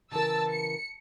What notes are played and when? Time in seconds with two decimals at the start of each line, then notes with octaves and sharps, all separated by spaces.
0.12 C#3 E3 A#4 A5 E6
0.49 C#7